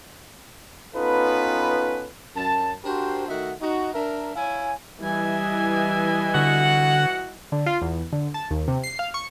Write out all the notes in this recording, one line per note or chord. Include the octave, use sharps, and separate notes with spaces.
B3 C#4 D#4 F4 A4 B4
F#2 A5
D4 F#4 G4 A#4 C5
D#3 A3 F#4 D#5 E5 F#5
D#4 F#4
D4 A#4 E5
E4 C#5 F5 G#5
E3 G3 D#5 E5 G#5
D3 F#4 F#5
D3
F4
E2
D3
A5
D#2
C3
C7
F5
C#6